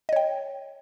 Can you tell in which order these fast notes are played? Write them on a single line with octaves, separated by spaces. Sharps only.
D#5 C#5 G5